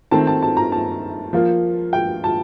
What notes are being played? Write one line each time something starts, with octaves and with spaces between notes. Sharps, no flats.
D#3 A3 C4 A5
A5
A5
A#5
A5
F3 A#3 F4
G5
A5